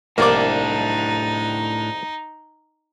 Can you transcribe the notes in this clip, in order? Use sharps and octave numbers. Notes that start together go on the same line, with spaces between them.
C2 F2 A2 A#3 D4 D#4 D6